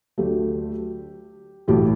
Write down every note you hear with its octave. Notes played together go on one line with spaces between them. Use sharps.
D2 D3 F#3 A3 G4
B1 A2 E3 G4